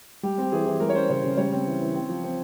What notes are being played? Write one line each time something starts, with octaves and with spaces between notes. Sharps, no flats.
G3 G4
C4 G4
E3 G#4
E3
G3 A#4
C#5
C#4 C5
C#3 C#5
C#3
G3 C#5
C4
E3
E3
C4
F3
C4